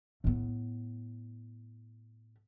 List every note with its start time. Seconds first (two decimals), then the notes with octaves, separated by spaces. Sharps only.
0.24 A2 B3